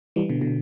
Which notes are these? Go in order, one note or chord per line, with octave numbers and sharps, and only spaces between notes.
E3 G3
B2 D3
B2 D3